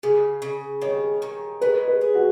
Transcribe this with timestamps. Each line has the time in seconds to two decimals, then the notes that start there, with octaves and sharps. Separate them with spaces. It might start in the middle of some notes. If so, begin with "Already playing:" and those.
0.03 C#3 G#4
0.42 C#3
0.82 D#3 C#5
1.22 D#3
1.61 G#3 B4
1.88 B4
2.01 G#4
2.15 F#4